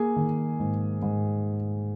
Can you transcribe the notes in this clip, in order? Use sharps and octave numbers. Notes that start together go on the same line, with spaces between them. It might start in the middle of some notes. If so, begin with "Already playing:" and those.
Already playing: A#3 G#4 G#5
D#3
G#2
G#2